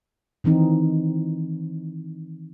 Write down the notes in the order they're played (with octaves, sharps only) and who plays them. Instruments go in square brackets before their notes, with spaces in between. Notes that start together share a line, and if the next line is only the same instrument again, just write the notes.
[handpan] D#3 E3 C4 D#4